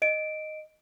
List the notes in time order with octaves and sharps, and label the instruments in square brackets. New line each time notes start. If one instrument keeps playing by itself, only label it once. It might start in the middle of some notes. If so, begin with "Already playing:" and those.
[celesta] D#5 D7